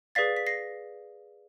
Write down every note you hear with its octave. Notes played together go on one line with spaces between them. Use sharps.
G#4 B4 D5 F5 A6 B6
B6
A#6 C7